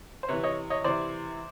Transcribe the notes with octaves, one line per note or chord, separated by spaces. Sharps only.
C5
C3 E3 B4 C#5
C#5 D#5
C#5 D#5
C3 E3 C5 D5